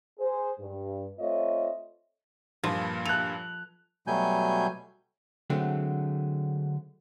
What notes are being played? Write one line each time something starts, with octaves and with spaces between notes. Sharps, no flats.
G#4 C5
G2
A3 C4 F4 C#5 D#5 E5
G2 A#2 F3 A#3
A4 F#6 F7
B2 F#3 G3 A3 G#5 G6
D3 F#3 G#3 A3 C4